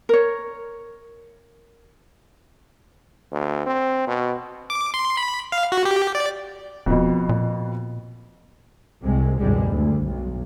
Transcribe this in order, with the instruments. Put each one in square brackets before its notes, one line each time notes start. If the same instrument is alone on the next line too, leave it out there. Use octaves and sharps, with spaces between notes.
[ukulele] A#4 C#5
[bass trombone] D2
C4
B2
[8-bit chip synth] D6
C6
B5
F5
F#4
G4
D5
[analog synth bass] D#1 [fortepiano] F2 B2
[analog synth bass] A#2
[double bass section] C2 C3 G#3
G#1 C#2 F#2 B2 G3 G#3
D2
B1